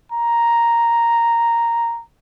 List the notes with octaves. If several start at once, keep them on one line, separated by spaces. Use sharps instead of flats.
A#5